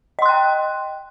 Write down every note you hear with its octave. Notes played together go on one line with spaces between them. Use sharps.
D#5 G5 C6 F#6